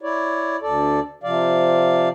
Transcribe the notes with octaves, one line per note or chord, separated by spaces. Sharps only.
E4 C#5 D5
D2 A4 D5
C3 F3 D5 F5